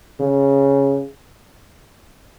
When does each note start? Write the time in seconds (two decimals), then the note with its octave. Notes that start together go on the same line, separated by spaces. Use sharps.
0.20 C#3